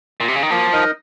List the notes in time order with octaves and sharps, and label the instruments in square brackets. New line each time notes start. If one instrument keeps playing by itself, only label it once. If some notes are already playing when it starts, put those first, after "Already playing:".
[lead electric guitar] A#2
C3
C#3
D#3
[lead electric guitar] F3 [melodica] A#3
[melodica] D#4 A#4 D#5